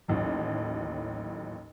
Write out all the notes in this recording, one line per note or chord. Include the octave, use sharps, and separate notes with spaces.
A1 D#2 A2 F#3